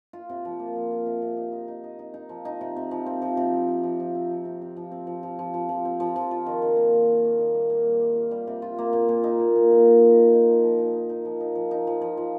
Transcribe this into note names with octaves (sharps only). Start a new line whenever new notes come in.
F4
C3
F3
A#3
F3
F4
C3
C3
D#4
D#4
D#4
D#4
D#4
D#4
F3
D#4
C3
C3
F3
C4
F3
C3
C4
C3
F3
F3
C4
F3
C3
C3
F3
C4
F3
F3
F3
F3
F3
C4
F3
F3
F4
D#3
D#3
A#3
D#3
D#3
A#3
D#3
G3
A#3
G3
G3
F4
G3
C3
F4
A#3
A#2
A#2
D#4
A#2
A#2
A#2
D#4
F3
D#4
D#4
F3
F3
D#4
D#4
D#4
F3
D#4
F3
D#4
F3
F3
F3